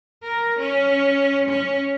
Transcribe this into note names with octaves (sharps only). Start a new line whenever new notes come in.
A#4
C#4
C#4